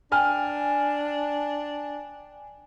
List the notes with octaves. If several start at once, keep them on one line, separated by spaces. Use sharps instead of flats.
D4 G5 G#5 F6